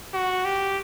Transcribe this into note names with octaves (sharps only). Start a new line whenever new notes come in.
F#4
G4